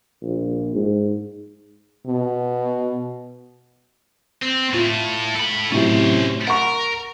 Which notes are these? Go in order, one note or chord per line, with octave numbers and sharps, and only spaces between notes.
A#1
G#2
B2
C4
A2 A3 F4
A4 B5
A2 C3 F#3 C#4 C5
A#4 F#5 C#6